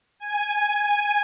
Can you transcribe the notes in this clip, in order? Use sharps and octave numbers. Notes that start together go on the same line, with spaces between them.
G#5